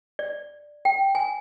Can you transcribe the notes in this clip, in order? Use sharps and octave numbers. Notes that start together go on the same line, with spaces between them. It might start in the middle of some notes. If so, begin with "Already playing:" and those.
D5
G5
G#5